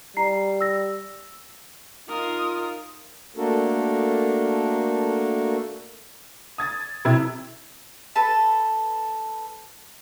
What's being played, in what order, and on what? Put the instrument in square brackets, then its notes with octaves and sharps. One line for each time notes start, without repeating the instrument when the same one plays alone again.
[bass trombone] G3 [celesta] A#5 C7
[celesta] E6 A#6
[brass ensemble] D#4 F4 [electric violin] A#4 D#6
[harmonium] A3 A#3 D4 F#4 A4 A#4
[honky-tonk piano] D#6 G#6 A6
C3 E4 G#6
[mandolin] A4 B4 A5